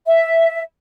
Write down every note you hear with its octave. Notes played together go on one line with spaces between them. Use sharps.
E5